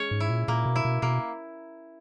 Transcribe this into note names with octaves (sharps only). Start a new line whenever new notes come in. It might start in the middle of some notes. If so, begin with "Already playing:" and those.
Already playing: G#3 C#4 C#5
G#2
E4
A#2
A#2 A#3
B2
E4
B2
B2 A#3